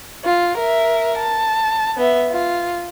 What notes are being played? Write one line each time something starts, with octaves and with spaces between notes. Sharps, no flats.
F4
A#4 E5
A5
B3 E5
F4